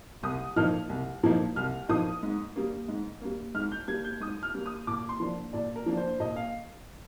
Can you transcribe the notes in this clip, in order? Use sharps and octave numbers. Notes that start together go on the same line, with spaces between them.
C2 D#6
A#2 F3 A#3 D#4 F6
C2
A#2 F3 A#3 D#4
C2 F6
A#2 F3 A#3 D#4 D#6
G#2
G3 A#3
G#2
G3 A#3
G#2 F6
G6
G3 A#3 G#6
G6
G#2 D#6
F6
G3 A#3
D#6
A#2 D6
C6
F3 A#3 D4
A#2 D5
A#4
F3 A#3 D4
C5
A#2 D#5
F5